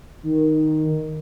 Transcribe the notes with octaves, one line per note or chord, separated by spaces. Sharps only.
D#3